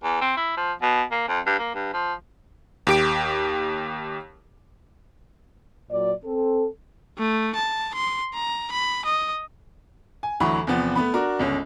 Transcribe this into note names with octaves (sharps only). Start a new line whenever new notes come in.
E2
C4
E4
F3
B2
A#3
F2
G2
A#3
G2
F3
D#2 G4 D7
A#2 F#3 D5
C4 A4
A3
A5
C6
A#5
B5
D#5
G#5
D2 E3 F#3 B5 C#6
E2 C3 F3 B3
A3 B3 B5
D4 F#4 A#4
G1 C#2 C#4